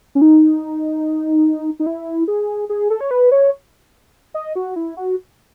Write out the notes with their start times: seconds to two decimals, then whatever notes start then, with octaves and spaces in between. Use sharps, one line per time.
0.15 C#4
0.21 D#4
1.80 D#4
1.86 E4
2.28 G#4
2.69 G#4
2.90 A4
3.01 C#5
3.11 B4
3.32 C#5
4.34 D#5
4.56 F#4
4.76 E4
4.97 F#4